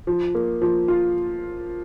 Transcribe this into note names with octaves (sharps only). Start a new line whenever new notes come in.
F3
A#3
F3
F4